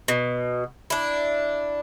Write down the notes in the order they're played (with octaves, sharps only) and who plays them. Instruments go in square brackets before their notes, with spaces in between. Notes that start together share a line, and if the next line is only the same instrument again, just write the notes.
[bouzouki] B2
D4 E4